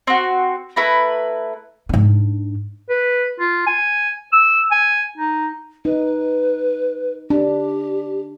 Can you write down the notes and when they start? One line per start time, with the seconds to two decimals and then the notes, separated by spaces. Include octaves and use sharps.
0.07 C4 F#4
0.76 A3 E4 B4 A#5
1.89 G#2 D4
2.90 B4
3.40 F4
3.67 G#5
4.33 E6
4.72 G#5
5.18 D#4
5.85 D#4 B4
7.30 D4 G4